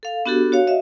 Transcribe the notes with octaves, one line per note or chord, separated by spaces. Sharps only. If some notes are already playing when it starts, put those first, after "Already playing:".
A4 F5
B3 D4 F#4 G4 A4
F#4 C#5 F5
D#5 E5